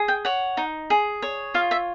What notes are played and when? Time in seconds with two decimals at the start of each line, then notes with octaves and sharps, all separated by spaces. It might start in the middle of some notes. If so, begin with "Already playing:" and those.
Already playing: G#4
0.08 G5
0.25 C#5 F#5
0.57 D#4
0.90 G#4
1.22 C#5
1.54 F4 F5
1.71 E5